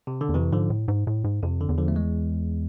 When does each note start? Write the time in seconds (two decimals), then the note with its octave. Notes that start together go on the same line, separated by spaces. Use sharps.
0.07 C3
0.21 D3
0.29 E2
0.34 F2 C3 E3
0.52 G#2 D3 F3
0.70 A2
0.88 G#2
1.07 A2
1.24 G#2
1.43 F2 C3
1.61 D3
1.69 E2
1.78 D3 F3
1.88 A3
1.96 E3 G#3